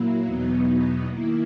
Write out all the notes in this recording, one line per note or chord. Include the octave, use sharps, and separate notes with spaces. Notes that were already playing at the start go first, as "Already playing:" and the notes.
Already playing: A#2 F#3 A#3 E4
E2 B2 F#3 B3 D#4
D#3 A#3 E4